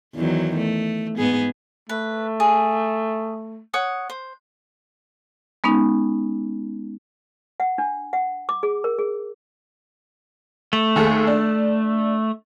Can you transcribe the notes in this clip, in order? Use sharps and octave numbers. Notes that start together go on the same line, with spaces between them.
E2 D#3 F#3
A3
G#2 B3 G#4
A3 B4
G#4
C#5 F#5 D#6
C5
G#3 B3 C#4 D#4
F#5
D4
F#5
D6
G#4
A#4
G#4
A3
D#2 G#4 A4
D4